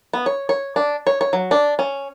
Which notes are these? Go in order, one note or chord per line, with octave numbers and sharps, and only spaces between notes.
B3
C#5
C#5
D4
C#5
C#5
F#3
D4
C#4